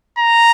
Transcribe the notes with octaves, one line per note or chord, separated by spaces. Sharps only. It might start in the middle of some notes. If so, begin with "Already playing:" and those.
A#5